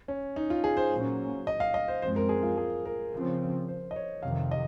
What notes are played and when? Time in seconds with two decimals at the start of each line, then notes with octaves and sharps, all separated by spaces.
0.08 C#4
0.36 D#4
0.50 F4
0.64 G#4
0.77 C5
0.91 A#2 F#3 A#3 C#4
1.47 D#5
1.60 F5
1.74 D#5
1.88 C5
2.02 F#2 F3 G#3 C4 C5
2.16 A#4
2.29 G#4
2.43 F4
2.57 G#4
2.85 A#4
3.13 C#3 F3 C4
3.68 C5
3.91 D#5
3.96 C#5
4.23 F2 C3 D#3 F5
4.51 D#5